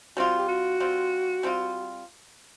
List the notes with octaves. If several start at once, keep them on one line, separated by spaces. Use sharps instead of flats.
G3 C4 F4 F#4
G4
F#4
G3 C4 F4
G3 C4 F4